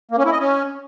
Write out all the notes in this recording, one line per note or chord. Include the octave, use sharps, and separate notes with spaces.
A#3
C#4
E4
D#5
C#4